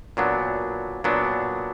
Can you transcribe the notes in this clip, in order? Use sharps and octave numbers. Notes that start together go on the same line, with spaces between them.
A#2 F#3 B3 D4
A#2 F#3 B3 D4